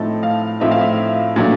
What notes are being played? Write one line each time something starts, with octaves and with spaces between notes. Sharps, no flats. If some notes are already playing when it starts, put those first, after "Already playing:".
Already playing: A2 F3 A3 C4 D#4 A5
F5
A2 F3 A3 C4 D#4 E5
F5
E5
A#2 F#3 A3 D4